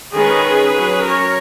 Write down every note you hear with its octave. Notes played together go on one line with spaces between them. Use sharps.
D#3 G#3 C#4 G#4 B4
F#3 C#4
A#4 C#5